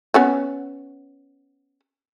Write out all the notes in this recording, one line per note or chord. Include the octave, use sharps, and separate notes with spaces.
B3 C#4 F#4